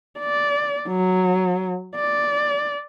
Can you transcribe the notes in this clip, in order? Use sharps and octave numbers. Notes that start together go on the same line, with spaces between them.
D5
F#3
D5